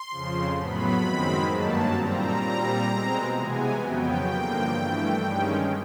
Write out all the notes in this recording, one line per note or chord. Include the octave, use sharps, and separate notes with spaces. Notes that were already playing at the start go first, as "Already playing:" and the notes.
Already playing: C6
F2 C#3 F3
A2 F#3 B3 B5
F#2 D#3 G#3 C4
G2 D#3 F#3 A#3 A5
A#2 G3 C4 A#5
A#2 G3 C4
B2 G#3 C4
C3 E3 G#3 B3 G#5
F2 C#3 F#3 B3 G5
G2 D3 F3 A#3
G2 E3 A3
G2 D#3 G#3 C#4